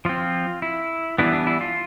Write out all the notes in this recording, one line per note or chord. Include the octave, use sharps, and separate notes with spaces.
F3 C4 F4
E4
E3 G3 B3 D4 E4
D4
E4
F4